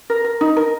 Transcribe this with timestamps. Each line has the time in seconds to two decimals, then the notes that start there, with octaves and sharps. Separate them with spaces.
0.10 A#4
0.24 A#4
0.41 D#4
0.57 A#4